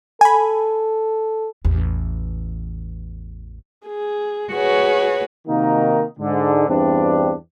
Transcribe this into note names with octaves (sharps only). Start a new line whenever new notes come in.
A4 G#5 B5
A1 E2
G#4
F#4 G#4 B4 C#5
C3 D#3 A#3 D#4 F#4 A#4
G#2 D3
E2 G2 C4 D4